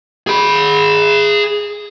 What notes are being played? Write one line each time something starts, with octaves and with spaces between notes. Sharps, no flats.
G#4 B5